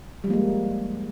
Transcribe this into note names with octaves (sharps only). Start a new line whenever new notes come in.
F3 G3 G#3 A#3